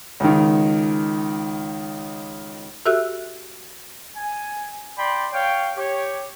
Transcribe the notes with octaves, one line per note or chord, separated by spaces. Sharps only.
C#2 D#3
F#4 G4 A4 E5 E6 F#6
G#5
D5 G5 B5 C6
C#5 F5 G5
G4 C#5